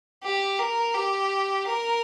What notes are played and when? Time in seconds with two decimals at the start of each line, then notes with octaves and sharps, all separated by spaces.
0.23 G4
0.59 A#4
0.94 G4
1.67 A#4